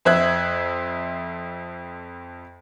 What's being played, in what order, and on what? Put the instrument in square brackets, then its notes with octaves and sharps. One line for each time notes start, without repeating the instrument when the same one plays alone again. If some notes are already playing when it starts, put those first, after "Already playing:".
[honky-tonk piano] F2 C5 E5 F#6 G#6